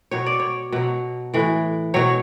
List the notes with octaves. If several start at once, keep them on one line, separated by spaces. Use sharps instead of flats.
B2 F#3 C#5
D5
C#5
B2 F#3
A2 E3
B2 F#3 C#5